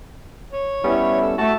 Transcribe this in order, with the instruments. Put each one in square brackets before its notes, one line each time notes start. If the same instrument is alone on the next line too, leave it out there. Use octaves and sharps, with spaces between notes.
[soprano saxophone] C#5
[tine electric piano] G3 B3 C#4 [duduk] E4
[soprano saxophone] A4
[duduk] A3 [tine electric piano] F#4 A4 [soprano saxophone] A5